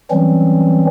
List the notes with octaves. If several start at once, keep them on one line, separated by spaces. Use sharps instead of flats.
E3 F#3 G3 C4 C#4